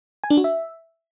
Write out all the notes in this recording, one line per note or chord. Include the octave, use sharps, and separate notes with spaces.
G#5
D4
F#4
E5